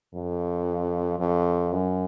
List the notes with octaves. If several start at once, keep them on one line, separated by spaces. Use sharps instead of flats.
F2
F2
F#2